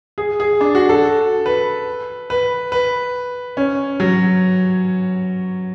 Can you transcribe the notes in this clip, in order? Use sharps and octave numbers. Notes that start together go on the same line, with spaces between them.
G#4
G#4
D4
F#4
A4
B4
B4
B4
C#4
F#3